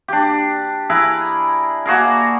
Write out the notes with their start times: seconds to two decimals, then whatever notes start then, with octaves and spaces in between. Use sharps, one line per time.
0.08 D4 G4
0.90 E4 G#4 A#4 B4
1.86 A#3 F#4 G#4 A#4